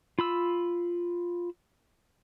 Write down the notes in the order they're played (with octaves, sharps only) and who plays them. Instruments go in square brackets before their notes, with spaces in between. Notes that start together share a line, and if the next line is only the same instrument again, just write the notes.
[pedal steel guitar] F4 B5 E6